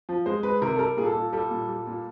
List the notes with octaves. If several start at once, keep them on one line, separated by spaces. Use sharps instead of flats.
F3
G#3 C5
G#3 B4
C3 A#4
A4
G3 A#4
A#2 G#4
A4
A#2
G3 A4
A#2
G3
A#2